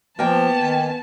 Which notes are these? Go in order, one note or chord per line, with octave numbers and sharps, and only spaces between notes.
F3 A#3 B3 G5 A5
D#3 G#5